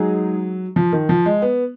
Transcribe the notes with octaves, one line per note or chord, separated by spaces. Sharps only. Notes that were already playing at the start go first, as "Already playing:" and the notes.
Already playing: F#3 G#3 D#4 G#4
F3
D#3
F3
G#3
B3